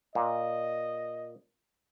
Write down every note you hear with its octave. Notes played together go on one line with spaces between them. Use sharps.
A#2 D#5